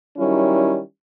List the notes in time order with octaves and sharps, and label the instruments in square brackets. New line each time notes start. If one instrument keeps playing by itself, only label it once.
[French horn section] D#3 F#3 G3 C#4 E4